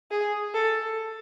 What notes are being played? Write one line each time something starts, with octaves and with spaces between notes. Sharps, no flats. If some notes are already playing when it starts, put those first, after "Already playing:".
G#4
A4